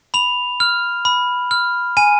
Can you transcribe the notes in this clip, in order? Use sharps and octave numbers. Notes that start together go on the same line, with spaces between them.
B5 F7
F6
B5
F6
G#5 D#7